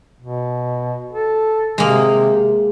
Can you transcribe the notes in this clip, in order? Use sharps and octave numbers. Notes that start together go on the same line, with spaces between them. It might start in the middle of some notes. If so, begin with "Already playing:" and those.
B2
A4
C3 G#3 A#3